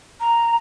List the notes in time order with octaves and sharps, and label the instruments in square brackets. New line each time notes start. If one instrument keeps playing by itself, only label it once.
[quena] A#5